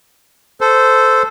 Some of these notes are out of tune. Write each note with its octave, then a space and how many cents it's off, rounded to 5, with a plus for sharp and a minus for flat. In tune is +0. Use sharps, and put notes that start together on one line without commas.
A4 +0 C5 -15